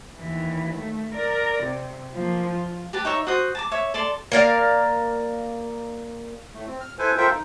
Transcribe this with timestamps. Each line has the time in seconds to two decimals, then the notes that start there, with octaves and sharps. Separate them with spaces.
0.17 D#2 E3
0.77 A3
1.14 A#4 D5
1.63 C3
2.14 F3 A#3
2.49 F4
2.93 G4 B4 A5
3.05 D#4 C#5 E5
3.27 F#4 C5 D#6
3.55 A5 A#5 D6
3.72 C#5 E5
3.94 A4 D5 A5 C6
4.32 A#3 A#4 D5 F5
6.54 A2 A3
6.67 C4
6.81 F6
6.99 E4 A4 B4 C5 G#5
7.18 F4 A4 A#4 C5 E5 G5
7.30 D#4